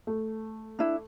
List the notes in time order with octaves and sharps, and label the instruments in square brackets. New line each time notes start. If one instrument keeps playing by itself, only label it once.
[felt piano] A3
[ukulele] D4 E4